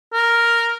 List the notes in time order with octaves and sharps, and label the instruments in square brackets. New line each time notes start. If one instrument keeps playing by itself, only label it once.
[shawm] A#4